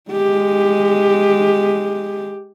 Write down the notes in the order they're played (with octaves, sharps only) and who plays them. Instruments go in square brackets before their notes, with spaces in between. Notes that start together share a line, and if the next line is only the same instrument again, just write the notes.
[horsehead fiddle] G#3 G4